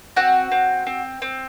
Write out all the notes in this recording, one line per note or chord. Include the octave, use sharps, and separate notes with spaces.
C4 F#4 F#5
C4
C4
C4